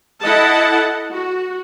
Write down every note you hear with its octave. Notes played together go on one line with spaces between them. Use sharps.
E4 A4 D#5 F#5 A5
F#4